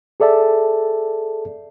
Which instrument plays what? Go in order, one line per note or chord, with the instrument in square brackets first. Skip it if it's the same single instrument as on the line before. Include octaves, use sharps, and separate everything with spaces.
[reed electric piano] G#4 A4 D5 E5 A5